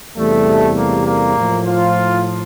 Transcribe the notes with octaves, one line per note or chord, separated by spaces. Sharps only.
E2 C3 G3 A3
A#3
A#3
A2 F3
F4